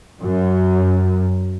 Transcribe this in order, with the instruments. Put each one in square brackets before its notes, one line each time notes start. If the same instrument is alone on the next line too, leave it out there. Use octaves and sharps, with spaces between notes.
[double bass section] F#2